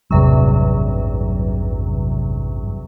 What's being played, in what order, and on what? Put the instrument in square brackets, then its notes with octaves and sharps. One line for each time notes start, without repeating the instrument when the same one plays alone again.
[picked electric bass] A1 G2 [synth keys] E2 C3 F#3